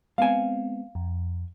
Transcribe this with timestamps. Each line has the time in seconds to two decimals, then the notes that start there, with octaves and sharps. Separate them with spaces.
0.18 G#3 B3 C4 F5 G#5
0.95 F2